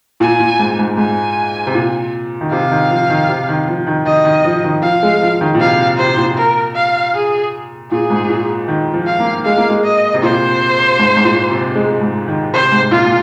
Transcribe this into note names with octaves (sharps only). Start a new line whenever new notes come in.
A#2 G#5
A#2
G#2
G#2
G#2 G#5
C3
A#2
D#3
C3 F5
D#3
F3
D#3
C3
D#3
F3
D#3
D#3 D#5
D#3
F3
D#3
F3 F5
G#3
F3
D#3
A#2
C3 F5
C3 C5
A#2
A#4
F5
G#4
A#2 G#4
G#2
A#2
D#3
F3
F5
A#3
G#3 F5
A#3
G#3
D#5
C3
A#2 C5
G#2
G#2
A#2
C3
G#3
G#2
D#3
C3 C5
G#2
A#2 F4
A#2